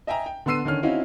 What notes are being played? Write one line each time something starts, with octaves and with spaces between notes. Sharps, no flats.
D#5 E5 G5 G#5 A#5
G5
D3 B3 C6 E6 C7 D#7
D3 D#3 C#4 F6
C4 C#4 D#4 E4 F#4 F5